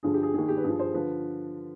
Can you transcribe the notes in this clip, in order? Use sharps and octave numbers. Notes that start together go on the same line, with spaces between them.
G2 D3 F3 G#4
G4
G#4
D#2 D#3 G#4
G4
B4
G2 F3 G#4
C5
D3 F3 B4